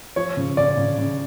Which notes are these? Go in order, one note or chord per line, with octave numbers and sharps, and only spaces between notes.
F3 C#5
C#3
C#3 D5
C#3
C#3